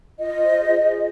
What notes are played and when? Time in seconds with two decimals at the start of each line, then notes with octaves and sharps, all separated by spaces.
0.18 F4 D#5
0.39 C5
0.60 G#4
0.80 G#4